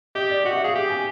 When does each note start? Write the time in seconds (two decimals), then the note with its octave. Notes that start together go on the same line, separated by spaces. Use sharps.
0.15 G4 D#5
0.30 D5
0.45 F#4 D#5
0.55 E5
0.64 G#4 F5
0.75 G4
0.90 G#5